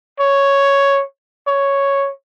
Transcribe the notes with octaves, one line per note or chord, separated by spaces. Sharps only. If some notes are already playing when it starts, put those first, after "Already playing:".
C#5
C#5